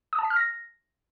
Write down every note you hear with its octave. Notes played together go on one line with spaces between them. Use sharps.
D#6
A5
B6
F6
A#6